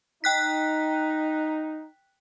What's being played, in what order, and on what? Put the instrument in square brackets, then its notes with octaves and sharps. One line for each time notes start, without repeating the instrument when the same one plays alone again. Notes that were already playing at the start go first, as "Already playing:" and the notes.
[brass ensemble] D#4 [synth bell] G5 F#6 B6